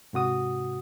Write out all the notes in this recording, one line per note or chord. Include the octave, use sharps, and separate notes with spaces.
G#2 C3 F#4 D#6